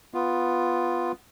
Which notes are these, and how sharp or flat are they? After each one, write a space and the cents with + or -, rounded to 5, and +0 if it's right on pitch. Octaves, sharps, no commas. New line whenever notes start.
B3 +5 F4 +0